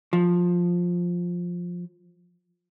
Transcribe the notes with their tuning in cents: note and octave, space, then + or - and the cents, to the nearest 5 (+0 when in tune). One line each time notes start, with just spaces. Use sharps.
F3 +10